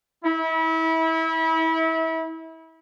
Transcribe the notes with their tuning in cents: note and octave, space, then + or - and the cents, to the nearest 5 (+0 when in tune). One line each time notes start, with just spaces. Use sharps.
E4 -30